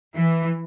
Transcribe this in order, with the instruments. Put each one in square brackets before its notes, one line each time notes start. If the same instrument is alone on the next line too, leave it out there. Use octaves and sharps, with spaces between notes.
[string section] E3